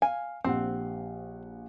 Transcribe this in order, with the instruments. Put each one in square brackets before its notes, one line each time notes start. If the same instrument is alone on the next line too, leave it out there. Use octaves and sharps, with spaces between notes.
[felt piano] F5 [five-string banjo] G#5
[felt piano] A#1 G4 F#5 [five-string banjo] C4